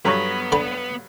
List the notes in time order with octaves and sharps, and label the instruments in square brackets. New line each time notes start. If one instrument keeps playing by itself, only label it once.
[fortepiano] G2 F#3 A#5 [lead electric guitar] B3 B4 [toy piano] A4 C#6
[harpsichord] D3 B5